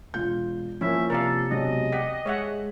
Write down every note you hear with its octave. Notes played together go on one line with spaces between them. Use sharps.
E1 F4 G6
F3 A#3 C#4 E4 E5
C3 A4 A#4 D5 F5
B2 F#3 G#3 D4 D#5
G4 D5 F#5 B6
G#3 C#5 E5 F#5